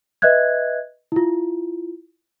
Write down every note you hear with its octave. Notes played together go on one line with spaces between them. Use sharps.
B4 D#5 E5 F#6 G#6
E4 F4